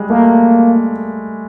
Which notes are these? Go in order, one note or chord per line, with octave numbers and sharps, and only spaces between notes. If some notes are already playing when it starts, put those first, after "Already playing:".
Already playing: G3 G#3
A3 A#3